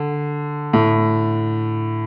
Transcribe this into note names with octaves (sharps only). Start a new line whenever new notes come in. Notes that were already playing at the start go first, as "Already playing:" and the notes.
Already playing: D3
A2